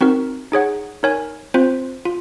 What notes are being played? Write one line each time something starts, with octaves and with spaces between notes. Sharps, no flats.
C4 D#4 F#4 A#4
D#4 G#4 C#5 F#5
D#4 A#4 C#5 G#5
C4 F4 C5
F4